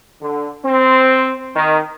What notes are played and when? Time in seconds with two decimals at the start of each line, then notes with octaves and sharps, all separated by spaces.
0.22 D3
0.65 C4
1.55 D#3